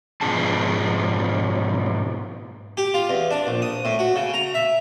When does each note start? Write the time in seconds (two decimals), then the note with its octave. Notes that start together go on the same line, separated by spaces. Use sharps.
0.21 G#2 B2 F3 C#4 G#4 A5
2.77 G4
2.94 F4
3.09 E2
3.31 D4
3.47 A#1
3.62 D#6
3.85 A2
3.99 F#4
4.16 C#3
4.34 A#5
4.54 E5